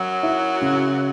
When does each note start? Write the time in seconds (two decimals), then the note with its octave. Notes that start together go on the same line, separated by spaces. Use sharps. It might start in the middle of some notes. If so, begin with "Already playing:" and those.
Already playing: F#2 F#3
0.23 E4
0.61 C#3